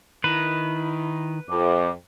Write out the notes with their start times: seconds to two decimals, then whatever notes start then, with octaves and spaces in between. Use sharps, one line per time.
0.24 D#3 E4 B4
1.49 F2 D6